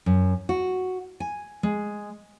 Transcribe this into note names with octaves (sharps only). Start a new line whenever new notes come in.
F#2
F#4
G#5
G#3